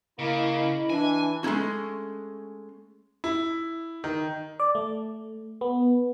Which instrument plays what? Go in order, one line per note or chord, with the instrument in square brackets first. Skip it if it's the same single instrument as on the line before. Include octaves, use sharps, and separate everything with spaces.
[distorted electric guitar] C#3 [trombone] A#3 [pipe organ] E4 D#5 B5
[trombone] E3 [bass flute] D4 [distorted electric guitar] G#5
[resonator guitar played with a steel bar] G#3 A3 C#4 E4 F#4
[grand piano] E4
D#3
[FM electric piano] D5
A3
B3